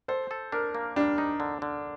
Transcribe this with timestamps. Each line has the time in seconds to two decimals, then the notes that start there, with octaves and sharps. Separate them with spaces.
0.08 A4 C5
0.31 A4
0.52 D4 A#4
0.75 A#3
0.96 G3 D4
1.18 D#4
1.40 D3
1.62 D3